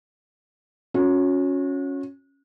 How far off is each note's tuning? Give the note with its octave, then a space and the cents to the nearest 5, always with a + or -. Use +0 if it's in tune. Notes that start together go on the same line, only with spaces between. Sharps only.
C#4 +0 F#4 -35